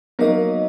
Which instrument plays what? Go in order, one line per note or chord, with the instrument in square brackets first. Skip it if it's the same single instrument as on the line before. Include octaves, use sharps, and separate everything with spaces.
[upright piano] F#3 A#3 [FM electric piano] B3 D#4 A#4 D#5